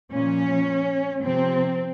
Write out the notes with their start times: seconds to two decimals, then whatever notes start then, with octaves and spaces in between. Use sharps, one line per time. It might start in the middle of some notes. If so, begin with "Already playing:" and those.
0.12 A#2 F3 C#4
1.23 C3 F3 C4